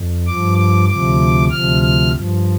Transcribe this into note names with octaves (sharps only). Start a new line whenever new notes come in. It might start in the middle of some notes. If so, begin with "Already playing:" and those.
Already playing: F2
G2 F3 D6
D6
D2 C3 F3 D6
D2 C3 F3 F6
F6
G2 F3